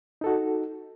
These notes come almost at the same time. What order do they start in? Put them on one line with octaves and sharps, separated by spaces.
D#4 A4 F#4